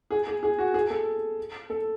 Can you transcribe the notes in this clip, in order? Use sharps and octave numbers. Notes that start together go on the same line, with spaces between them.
G#4
G#4
G#4
F#4
G#4
A4
A4